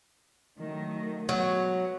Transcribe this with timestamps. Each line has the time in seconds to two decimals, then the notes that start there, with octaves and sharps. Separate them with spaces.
0.59 D#3 F#3 A3
1.29 F#3 G#3 B3